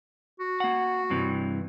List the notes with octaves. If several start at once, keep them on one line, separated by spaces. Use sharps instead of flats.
F#4
A#3 F#5
G2 C3 E3